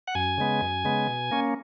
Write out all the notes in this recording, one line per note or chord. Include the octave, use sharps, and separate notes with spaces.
F#5
F#2 G#5
C#3 G#3 B3
F#2
C#3 G#3 B3
B2
A#3 C#4